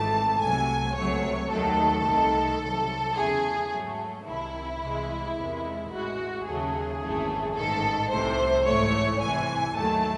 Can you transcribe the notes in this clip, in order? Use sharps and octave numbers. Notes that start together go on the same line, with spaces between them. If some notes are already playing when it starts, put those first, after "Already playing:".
Already playing: G#1 G#2 E3 A3 A5
C2 C3 F#3 A3 G#5
C#2 C3 F#3 A3 C#5
D#2 D#3 F#3 A3 A4
C2 C3 D#3 A3
C2 C3 F#3
E2 C#3 E3 A3 G#4
G#2 F#3 A3
C2 C3 D#3 E4
C2 C3 E3 G#3
E2 C3 D#3 G#3
A1 A2 G#3 F#4
D#2 C#3 F#3 A3 G#4
G#1 F#2 E3 A3
A1 G#2 D#3 A4
C2 C3 E3 A3 C5
A1 G#2 E3 A3 C#5
C2 C3 E3 G#5
D#2 D#3 F#3 A3 A5